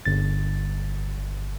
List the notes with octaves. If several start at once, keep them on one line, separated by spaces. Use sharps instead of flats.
G1 A6